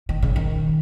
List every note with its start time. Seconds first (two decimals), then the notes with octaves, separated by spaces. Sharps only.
0.09 D#3
0.22 C#3
0.36 D#3